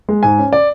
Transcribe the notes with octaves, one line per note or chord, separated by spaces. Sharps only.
G#3
G#2 G#5
C#4
D5